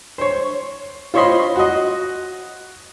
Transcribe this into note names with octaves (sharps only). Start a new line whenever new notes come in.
C5 C#5
F4 C5 C#5 D#5 B5 C6
F#4 D#5